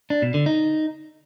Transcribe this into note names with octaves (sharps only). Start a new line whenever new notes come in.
D4
B2
D3
D#4